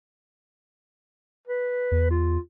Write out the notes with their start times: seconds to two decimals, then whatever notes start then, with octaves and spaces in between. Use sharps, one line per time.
1.47 B4
1.91 E2
2.11 F4